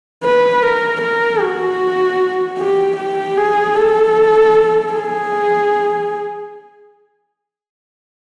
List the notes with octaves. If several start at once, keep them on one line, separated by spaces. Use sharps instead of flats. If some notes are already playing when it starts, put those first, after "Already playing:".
B4
A#4
A#4
F#4
G4
G4
G#4
A4
G#4